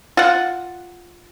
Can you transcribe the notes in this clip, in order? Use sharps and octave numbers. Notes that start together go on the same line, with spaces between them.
F4 F#5